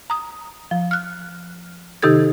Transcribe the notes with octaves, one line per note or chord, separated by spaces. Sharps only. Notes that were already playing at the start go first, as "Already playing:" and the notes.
A#5 D#6
F3
F6 F#6
C3 D#3 D#4 G4 A4 G#6